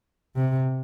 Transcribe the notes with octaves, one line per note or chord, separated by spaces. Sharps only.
C3